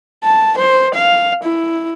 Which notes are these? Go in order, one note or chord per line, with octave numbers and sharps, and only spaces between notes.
A5
C5
F5
E4